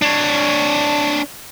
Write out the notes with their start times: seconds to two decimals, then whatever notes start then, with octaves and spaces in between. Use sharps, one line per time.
0.02 D4 C#5